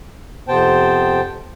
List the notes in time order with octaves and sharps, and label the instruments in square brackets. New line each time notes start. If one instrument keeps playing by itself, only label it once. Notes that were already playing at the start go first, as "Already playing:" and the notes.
[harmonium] F2 C3 B3 C5 G5 A5